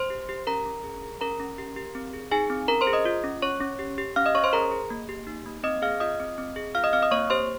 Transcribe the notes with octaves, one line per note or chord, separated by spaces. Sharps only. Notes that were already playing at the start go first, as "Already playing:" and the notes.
Already playing: C5 C6
G4
G4
C#4 A#4 A#5
C#4
G#4
G#4
C#4 A#4 A#5
C#4
G4
G4
C4
G#4
D#4 G#4 G#5
C4
C#4 A#4 A#5
C5 C6
G#4
D#5 D#6
F4
C#4
C#4 C#5 C#6
C#4
G4
G4
C#4 F5 F6
D#5 D#6
C#4 C#5 C#6
C5 C6
G#4 A#4 A#5
G#4
A#3
G4
D#4
A#3
C4 D#5 D#6
G#4 F5 F6
F4 D#5 D#6
C4
C4
G#4
F4 F5 F6
D#5 D#6
C4 F5 F6
D#5 D#6
A#3 C#5 C#6
G4 C5 C6